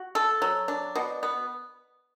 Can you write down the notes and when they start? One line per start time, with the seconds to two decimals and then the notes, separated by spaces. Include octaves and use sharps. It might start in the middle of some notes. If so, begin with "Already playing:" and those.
Already playing: F#4
0.15 A4
0.42 F#3
0.68 D4
0.95 B2
1.23 B3